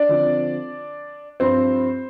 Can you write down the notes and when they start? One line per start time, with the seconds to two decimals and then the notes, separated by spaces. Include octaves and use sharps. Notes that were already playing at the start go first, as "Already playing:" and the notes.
Already playing: D4 D5
0.09 D3 F3 C4
1.40 G2 F3 C4 C5